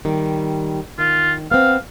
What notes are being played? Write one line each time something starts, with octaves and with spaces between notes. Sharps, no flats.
D#3 G3
D#3 F4
B3 C4 F5